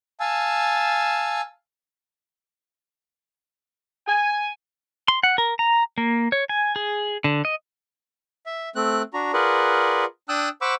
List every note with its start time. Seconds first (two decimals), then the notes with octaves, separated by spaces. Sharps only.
0.20 F5 G#5 A5 E6
4.07 G#5
5.08 C6
5.23 F#5
5.38 A#4
5.59 A#5
5.98 A#3
6.32 C#5
6.49 G#5
6.76 G#4
7.24 D3
7.45 D#5
8.46 E5
8.76 A3 C4 F#6
9.14 D4 F#4 A#5
9.33 F4 G#4 A#4 B4 D5 F#5
10.29 D4 G5 A5 D#6 E6 F#6
10.61 C5 F#5 B5 C#6 D6 E6